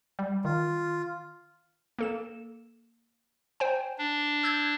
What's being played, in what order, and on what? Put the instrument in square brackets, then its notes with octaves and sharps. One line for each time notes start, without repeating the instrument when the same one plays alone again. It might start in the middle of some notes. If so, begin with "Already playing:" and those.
[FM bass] G3
[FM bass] D#3 [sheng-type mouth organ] F4
[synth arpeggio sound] A#3 A4 E7
C5 G5 G#5
[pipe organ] D4
[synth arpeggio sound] E6 G6 G#6